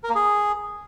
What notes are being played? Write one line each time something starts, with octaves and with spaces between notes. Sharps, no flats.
A#4
A#3
G#4